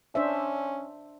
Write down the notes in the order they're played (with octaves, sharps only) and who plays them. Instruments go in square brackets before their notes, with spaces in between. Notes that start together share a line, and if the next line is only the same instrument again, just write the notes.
[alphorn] C#4 [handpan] D4 C5 E5